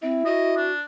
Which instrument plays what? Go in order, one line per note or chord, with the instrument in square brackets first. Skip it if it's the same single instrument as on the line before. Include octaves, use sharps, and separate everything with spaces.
[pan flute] C4 [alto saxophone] E4
[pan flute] F#4 [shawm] D#5
[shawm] D4